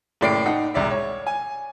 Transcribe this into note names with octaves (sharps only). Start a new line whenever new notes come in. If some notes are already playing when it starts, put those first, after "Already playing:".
F#1 A2 D5 G5 C7 D7
D#4 F#5 G5 A5
E1 C2 D5 E5
C#5
G#5